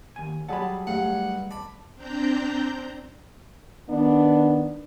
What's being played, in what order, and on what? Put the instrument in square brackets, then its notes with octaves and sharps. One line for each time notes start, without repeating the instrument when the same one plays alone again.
[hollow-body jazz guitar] D#2 G#5
[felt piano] F#3 G3 G#4 [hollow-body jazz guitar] F#5 B5 [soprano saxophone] A5
[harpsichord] G2 [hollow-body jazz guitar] A3 [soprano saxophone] F#5
[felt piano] A5 D6 [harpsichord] B5
[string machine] C4 D4 A#5 G6
[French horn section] D#3 B3 D4